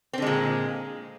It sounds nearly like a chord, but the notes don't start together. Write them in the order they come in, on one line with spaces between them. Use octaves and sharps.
C4 D3 G#3 A#2